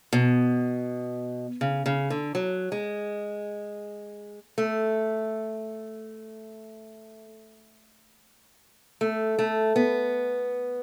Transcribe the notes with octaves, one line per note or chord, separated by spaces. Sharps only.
B2
C#3
C#3
D3
F#3
G#3
A3
A3
A3
B3